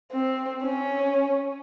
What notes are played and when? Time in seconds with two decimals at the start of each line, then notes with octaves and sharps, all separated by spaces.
0.12 C4
0.62 C#4